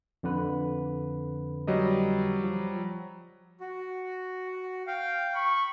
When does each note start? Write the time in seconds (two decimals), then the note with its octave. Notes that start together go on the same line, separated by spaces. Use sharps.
0.23 F2 D3 B4
1.67 F#3 G3 D#5
2.43 F3
3.61 F#4
4.87 F5 G5
5.35 B5 C#6